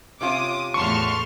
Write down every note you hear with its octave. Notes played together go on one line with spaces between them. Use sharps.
C3 C#4 F4 D6 D#6
E2 A2 A5 C6 C#6 F6